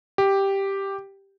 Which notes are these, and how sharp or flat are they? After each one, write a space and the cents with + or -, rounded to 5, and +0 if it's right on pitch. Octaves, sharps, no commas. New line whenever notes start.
G4 +0